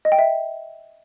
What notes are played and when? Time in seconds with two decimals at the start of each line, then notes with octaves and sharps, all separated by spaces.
0.05 D#5
0.12 G5
0.19 E5